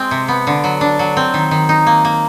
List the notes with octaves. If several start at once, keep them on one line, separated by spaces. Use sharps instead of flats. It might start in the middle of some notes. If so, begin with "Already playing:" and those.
Already playing: G#3 C4
C3
B3
D3
F#3
D4
F#3
C4
D#3
D#3
D#4
A#3
A#3